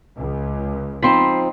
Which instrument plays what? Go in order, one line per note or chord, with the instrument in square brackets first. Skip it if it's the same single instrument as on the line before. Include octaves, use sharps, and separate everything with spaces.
[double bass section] C#2
[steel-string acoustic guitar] F3 C4 D#4 [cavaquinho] B5 C6